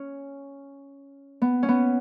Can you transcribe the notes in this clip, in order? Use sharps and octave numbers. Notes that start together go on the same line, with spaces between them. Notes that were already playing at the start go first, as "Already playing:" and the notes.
Already playing: C#4
B3
C#4
B3